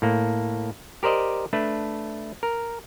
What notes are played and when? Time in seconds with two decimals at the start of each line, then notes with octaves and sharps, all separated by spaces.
0.02 A2 A#3
1.03 G4 A#4 C5 D5 D#5
1.53 A3 D4 B4
2.43 A#4